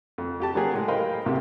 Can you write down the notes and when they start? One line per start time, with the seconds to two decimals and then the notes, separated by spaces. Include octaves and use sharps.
0.18 F2
0.40 F2 G4 A5
0.55 C#3 F#3 A#3 G4 G#4
0.73 A2 G#3
0.88 A#4 C5 D#5 F5 G5 B5
1.26 A1 C3 A#3 F#4 G4